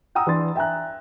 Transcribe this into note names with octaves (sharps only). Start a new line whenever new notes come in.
F#5 G5 A#5 D#6 E6
E3 D4 C6 A6
E5 G5 G#5 A#5 F#6